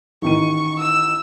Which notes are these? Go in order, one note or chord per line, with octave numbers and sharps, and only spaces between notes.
A1 D#3 C#6 D#7
E6